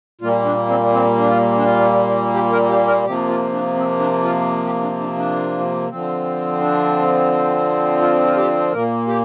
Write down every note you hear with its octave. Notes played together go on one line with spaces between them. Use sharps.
A#2 G3 A#3 F4
D4
C4
C4
D4
F4
D4
F4
G4
A#4
G4
A#4
C3 F3 A#3 G4
F4
D4
C4
D4
F4
G4
D4
D4
D4
D3 F3 C4
D4
F4
F4
G4
A#2 A#3 A#4
G4